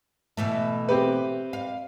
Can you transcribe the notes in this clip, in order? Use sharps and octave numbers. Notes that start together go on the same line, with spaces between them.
B2 E3 A3
C4 G4 B4
F5